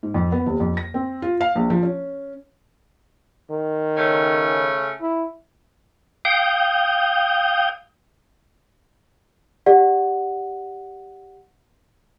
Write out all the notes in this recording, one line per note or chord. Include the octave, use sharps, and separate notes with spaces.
G#2
F2
B3
D#1
F2
A#6
C4
F4
F5
A#1
F3
C#4
D#3
C#3 A3 C#4
E4
F5 G5 D#6 G6
G4 D5 F#5